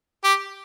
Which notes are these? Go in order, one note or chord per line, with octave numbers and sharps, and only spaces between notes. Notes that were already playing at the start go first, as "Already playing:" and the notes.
G4